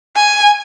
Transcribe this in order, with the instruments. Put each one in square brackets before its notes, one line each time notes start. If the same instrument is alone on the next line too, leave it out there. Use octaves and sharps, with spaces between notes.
[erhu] G#5